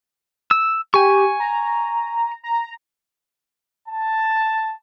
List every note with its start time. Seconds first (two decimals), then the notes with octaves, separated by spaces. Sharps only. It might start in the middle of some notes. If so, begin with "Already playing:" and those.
0.51 E6
0.94 G4 G#5 C#6
1.40 A#5
2.43 A#5
3.88 A5